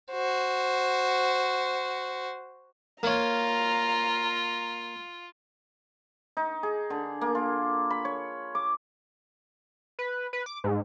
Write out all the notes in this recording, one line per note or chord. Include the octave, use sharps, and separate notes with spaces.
F#4 C5
A#3 F4 C#5 A#5
D#4
G#4
D3
A#3
F4
B5
C#5
D6
B4
B4
D6
G#2